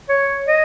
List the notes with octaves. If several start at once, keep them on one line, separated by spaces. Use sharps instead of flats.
C#5
D#5